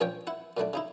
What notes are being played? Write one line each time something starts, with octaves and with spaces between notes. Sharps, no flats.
A#1 A#2 F3 C#4 C#5 G5
E4 F#5
A#2 F#3 A3 D4
C#3 D#4 E4